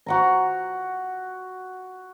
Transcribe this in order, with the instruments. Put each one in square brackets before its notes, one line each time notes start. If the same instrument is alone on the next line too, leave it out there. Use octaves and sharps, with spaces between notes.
[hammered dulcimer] F#4 F#5 A#5